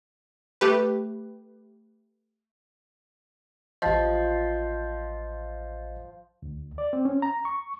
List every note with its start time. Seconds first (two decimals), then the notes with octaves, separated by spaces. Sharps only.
0.61 A3 G4 B4
3.82 A1 F3 D#5
6.42 D2
6.78 D5
6.93 C4
7.05 C#4
7.22 A#5
7.45 C#6